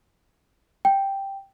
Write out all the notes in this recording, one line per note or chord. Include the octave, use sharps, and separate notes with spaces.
G5